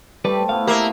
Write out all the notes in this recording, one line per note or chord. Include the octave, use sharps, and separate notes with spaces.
G3 A3 G4 B4 C5 D5
A3 B3 E4 F5
A#3 G4 E5 F5